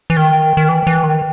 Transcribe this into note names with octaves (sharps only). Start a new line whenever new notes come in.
E3
D#3 G5
D#3
E3
E3
D#3